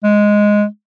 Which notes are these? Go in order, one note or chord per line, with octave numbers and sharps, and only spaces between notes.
G#3